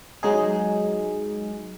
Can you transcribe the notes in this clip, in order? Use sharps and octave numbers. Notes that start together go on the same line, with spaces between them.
F#3 G#3 D#4 G#4